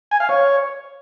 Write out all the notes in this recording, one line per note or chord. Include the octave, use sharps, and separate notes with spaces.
G#5
F5
C#5